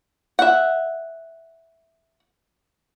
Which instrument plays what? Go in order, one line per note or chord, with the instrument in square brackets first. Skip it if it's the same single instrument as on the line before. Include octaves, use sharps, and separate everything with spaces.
[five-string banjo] E5 F#5